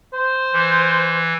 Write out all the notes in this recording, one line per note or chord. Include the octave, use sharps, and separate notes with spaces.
C5
E3